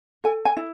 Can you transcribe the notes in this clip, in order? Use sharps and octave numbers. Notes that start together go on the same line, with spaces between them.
A4 G#5
G#5
E4